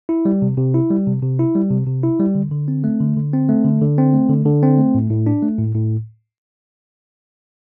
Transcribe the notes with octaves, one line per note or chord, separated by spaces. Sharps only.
E4
G3
C3
C3
E4
G3
C3
C3
E4
G3
C3
C3
E4
G3
D3
D3
C4
A3
D3
D3
C4
A3
D3
D3
C4
A3
D3
D3
C4
A3
A2
A2
D4
A3
A2
A2